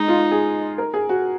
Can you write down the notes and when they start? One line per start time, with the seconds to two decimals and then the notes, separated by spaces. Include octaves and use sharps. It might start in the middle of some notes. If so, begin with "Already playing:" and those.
Already playing: G#3 D#4
0.08 F4
0.31 G#4
0.78 A#4
0.94 G#4
1.09 F#4